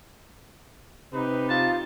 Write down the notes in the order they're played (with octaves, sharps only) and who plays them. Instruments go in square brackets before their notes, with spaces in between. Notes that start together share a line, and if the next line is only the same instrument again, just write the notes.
[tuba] C3 [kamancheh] D#4 G4 [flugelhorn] B4
[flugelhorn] F4 [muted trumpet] A5